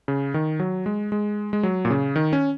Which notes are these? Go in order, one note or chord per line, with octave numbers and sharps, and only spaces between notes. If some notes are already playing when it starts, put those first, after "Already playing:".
C#3
D#3
F#3
G#3
G#3
G#3
F#3
A#2
C#3
D#3
C#4